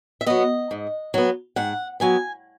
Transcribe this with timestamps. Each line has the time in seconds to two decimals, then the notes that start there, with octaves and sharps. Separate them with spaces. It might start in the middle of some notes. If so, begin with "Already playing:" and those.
0.21 E5
0.26 F#3 B3 D#5
0.71 G#2
1.14 F#3 B3
1.56 G#2 F#5
2.00 F#3 B3 G#5